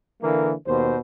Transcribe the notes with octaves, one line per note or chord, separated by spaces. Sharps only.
D3 E3 A#3
D#2 B2 C5